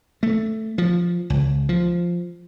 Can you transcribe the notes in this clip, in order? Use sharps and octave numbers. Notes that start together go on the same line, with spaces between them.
A3
F3
C#2
F3